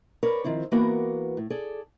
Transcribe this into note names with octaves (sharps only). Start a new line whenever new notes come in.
A#4 B4 C#5 D5
D#3 F3 C4 E4
E3 A#3 B3 F#4 A#4
A2
G#4 A4 D5